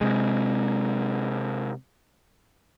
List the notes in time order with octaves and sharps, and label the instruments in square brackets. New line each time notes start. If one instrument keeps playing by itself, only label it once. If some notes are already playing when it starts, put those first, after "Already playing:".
[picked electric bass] C3 G#3